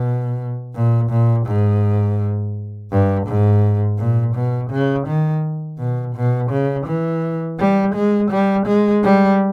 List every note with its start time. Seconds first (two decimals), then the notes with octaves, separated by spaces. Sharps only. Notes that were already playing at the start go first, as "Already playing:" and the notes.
Already playing: B2
0.75 A#2
1.10 A#2
1.47 G#2
2.91 G2
3.27 G#2
3.98 A#2
4.35 B2
4.70 C#3
5.07 D#3
5.79 B2
6.15 B2
6.51 C#3
6.86 E3
7.59 G3
7.95 G#3
8.30 G3
8.66 G#3
9.04 G3